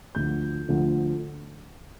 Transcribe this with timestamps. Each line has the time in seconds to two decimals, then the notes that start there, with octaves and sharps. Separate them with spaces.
0.15 D2 D3 F3 G6
0.68 D2 D3 F3